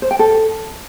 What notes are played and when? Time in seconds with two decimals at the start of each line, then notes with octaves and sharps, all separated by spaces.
0.02 C5
0.11 G5
0.19 A4